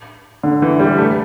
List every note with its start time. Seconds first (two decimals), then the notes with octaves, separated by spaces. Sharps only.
0.43 D3
0.62 E3
0.79 G3
0.98 A3